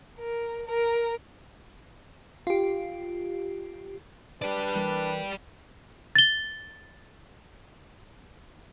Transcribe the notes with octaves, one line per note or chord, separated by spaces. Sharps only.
A#4
A#4
F4 G4
D4 G4 B4 D5
E3 G3 A#3
A6 G7